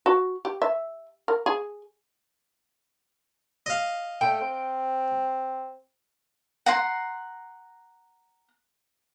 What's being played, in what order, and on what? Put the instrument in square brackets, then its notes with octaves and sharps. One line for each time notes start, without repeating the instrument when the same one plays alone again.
[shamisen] F#4
G4
E5
A#4
G#4
[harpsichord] D#5 F5
[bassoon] A3 [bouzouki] G5
[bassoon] C4
[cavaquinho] F#5 A#5 C6